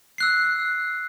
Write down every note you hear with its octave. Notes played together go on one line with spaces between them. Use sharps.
E6 F#6 C7